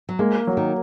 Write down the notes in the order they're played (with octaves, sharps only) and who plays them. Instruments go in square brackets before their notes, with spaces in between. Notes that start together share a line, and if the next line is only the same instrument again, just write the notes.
[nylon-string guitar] F#3
[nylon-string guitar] G#3 [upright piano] A#3
[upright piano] F#3
[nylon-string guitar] D#3